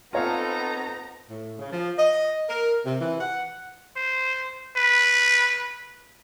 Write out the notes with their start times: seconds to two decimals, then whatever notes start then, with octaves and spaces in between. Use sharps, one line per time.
0.13 B3 C4 D#4 F4 A4 C#5 F5 A#5
1.30 A2
1.59 C#3
1.72 F3
1.99 D#5
2.49 A#4
2.86 C3
3.00 E3
3.20 F#5
3.97 C5
4.77 B4